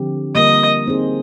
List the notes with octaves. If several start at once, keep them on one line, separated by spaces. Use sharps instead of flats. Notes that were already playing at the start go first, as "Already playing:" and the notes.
Already playing: D3 F3 C4 G4
D3 G3 A#3 F4 A#4 D#5
C4 D#4 G#4 C5